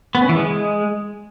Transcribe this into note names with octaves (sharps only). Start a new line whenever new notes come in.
B3
C#4
E3
G#3